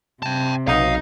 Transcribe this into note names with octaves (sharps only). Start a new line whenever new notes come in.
C3 G5 A5
B1 D#4 F5